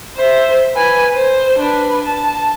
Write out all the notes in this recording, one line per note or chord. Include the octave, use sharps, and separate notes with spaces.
C5 E5
B4 G#5
C5
D4 B4
A5